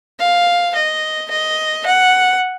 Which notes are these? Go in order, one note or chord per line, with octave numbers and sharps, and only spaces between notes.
F5
D#5
D#5
F#5